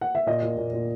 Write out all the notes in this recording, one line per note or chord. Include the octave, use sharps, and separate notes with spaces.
F#5
E5
A#2 D#5
A#2
A#2
A#2